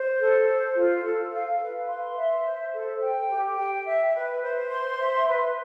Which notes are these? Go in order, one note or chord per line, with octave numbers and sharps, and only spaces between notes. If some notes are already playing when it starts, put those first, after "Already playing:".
Already playing: C5
A4
C5
F4
A4
F5
B4
C6
E5
C5
A4
G5
G4
G5
E5
B4
C5
C6
E5
B4